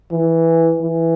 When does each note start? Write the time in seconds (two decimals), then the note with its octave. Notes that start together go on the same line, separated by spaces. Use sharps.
0.12 E3
0.82 E3